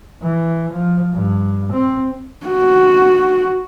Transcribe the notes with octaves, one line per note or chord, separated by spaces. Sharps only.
E3
F3
G2
C4
F#4